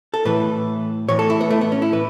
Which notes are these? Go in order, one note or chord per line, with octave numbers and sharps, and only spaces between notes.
A4
A2 E3 B4
A2 E3 C#5
A4
E4
B3
A3
B3
C#4
E4
E3 B4